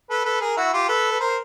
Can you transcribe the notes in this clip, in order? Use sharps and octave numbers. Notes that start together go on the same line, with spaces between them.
A4 B4
A4 B4
G#4 A#4
E4 F#4
F4 G4
A4 B4
B4
A#4 C5